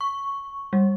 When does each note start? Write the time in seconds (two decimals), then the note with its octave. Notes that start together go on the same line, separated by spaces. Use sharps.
0.01 C#6
0.73 G3